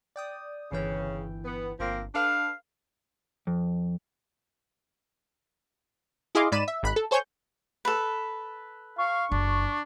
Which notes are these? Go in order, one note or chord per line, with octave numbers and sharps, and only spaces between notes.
D5 G5 D#6
G1 C#3 E3 G5
B3
G1 F3 A#3 C4
D4 A4 B4 F5
F2
E4 G#4 D#5 F5 C6 D6
G#2 D5 B5 D#7 E7
E5
G#1 B5 F#6
A4
A4 C5 C#5 G#5 C#6 G6
A4 B4
F5 C#6
F#1 D4